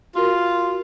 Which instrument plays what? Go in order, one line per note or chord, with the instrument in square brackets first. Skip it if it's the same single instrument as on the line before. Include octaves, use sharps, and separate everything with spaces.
[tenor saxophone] F4 [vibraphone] F#4 A#4